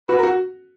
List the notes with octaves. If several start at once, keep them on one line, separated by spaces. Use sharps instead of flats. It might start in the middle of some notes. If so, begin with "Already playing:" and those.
F#4 B4
A#4
F#4